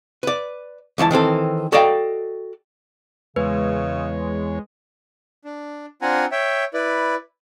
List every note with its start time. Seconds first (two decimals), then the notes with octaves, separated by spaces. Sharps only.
0.23 B4 D5
0.98 C#2 E3 D#5 A5
1.11 D#3 E3 C4 A4
1.72 F#4 A4 D5 D#5 F5 G5
3.36 E2 C#3 G#3 B4 C#5
5.45 D4
6.02 C4 D4 F4 F#5 G#5 A#5
6.32 C#5 E5 G5
6.74 E4 B4 D5